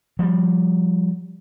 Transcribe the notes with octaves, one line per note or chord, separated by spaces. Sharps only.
F3 G3